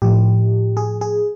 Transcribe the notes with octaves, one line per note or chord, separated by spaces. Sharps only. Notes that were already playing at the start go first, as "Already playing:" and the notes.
A2 F3 G4
G#4
G#4